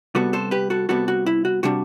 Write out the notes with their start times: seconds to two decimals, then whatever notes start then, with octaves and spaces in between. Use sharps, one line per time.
0.15 C3 G3 B3 F#4 A4
0.33 A4 C5
0.51 G4 B4
0.70 F#4 A4
0.89 C3 G3 B3 F#4 A4
1.08 F#4
1.26 E4
1.45 F#4
1.63 C3 G3 D4 F#4